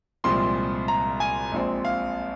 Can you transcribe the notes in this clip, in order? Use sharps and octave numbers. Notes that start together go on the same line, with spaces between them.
C2 A#2 F3 G#3 C4 C6
A#5
G#5
A#1 A#2 G#3 C4
F5